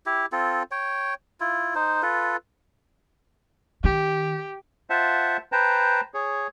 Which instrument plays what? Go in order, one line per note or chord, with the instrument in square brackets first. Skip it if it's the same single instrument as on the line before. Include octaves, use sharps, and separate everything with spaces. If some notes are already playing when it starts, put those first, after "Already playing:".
[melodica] E4 G4
C4 F4 A4
C#5 G5
E4 F4
D#4 C5
F4 A4 B4
[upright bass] D#3 [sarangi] G4
[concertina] F4 C5 E5 F#5 A5
B4 C5 G5 A5 A#5
G#4 C#5